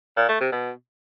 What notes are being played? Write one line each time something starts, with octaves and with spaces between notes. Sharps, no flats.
A#2
A3
C3
B2